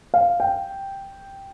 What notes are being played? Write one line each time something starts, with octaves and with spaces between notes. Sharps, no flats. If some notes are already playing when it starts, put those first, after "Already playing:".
F5
G5